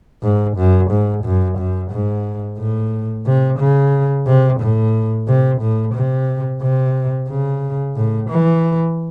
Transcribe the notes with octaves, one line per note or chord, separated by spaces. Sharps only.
G#2
F#2
G#2
F#2
F#2
G#2
A2
C3
C#3
C3
A2
C3
A2
C3
C3
C#3
A2
E3